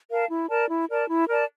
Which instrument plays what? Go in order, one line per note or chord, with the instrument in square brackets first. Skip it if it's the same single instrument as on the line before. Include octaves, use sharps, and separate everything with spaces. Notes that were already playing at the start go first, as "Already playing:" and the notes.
[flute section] A#4 F5 A5
E4
A#4 D5 A5
E4
A#4 D5 A5
E4
A#4 D5 A5